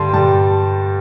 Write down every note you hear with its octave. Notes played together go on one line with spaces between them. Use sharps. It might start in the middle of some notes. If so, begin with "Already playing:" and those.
Already playing: G2 D3 G3 A5 C6
G5
G2 D3 G3 A5